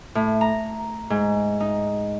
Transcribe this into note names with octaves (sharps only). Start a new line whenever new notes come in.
A2
A#5
G#2
D#4